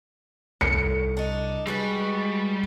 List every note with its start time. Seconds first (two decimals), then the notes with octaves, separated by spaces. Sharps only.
0.61 C2 A2 C#7
1.17 D4 D#4
1.67 G3 G#3 F#4 G4 B4